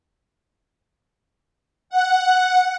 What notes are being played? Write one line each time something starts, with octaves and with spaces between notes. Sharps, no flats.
F#5